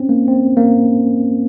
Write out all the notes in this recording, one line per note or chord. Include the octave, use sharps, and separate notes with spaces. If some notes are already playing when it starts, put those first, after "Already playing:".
Already playing: C4 C#4
A#3
C4
A#3